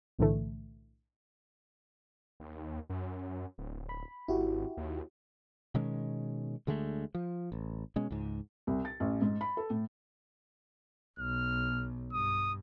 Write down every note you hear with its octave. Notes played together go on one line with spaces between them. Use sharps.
B1 A2 D3 E3 A3
D#2
F#2
D1
B5
G#1 E4 F#4 G4
D#2
B2 D#3 G#3 C#4
D2 D3 G#3 A3
F3
A1
B2 G#3 C#4
C#2 G#2
C2
A6
A1
G#2
B5
A4
A2
B1 F6
G2 D#6